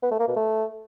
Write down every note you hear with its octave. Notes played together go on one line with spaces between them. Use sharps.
B3
A3
A#3
B2
A3